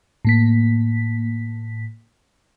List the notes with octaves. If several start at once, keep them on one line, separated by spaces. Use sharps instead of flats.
A2 A#3 B6